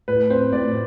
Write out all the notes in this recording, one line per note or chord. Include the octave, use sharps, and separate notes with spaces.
A2 B4
C4 C5
A2 D5